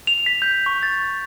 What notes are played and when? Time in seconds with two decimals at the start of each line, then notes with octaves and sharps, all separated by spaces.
0.07 F7
0.26 B6
0.42 G6
0.66 C#6
0.83 A6